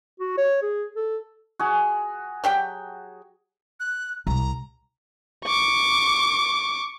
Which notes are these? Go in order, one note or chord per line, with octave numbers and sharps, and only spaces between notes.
F#4
C#5
G#4
A4
F#4 G#4
F#3 G4 G5
F#6
C2 A#5
C#6 D6